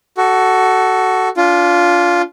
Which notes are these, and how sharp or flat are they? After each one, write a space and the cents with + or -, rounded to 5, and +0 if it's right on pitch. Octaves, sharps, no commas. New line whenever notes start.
F#4 +15 A4 +0
D4 -35 F4 +0